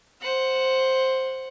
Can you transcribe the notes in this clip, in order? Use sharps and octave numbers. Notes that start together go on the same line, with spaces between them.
C5 F#5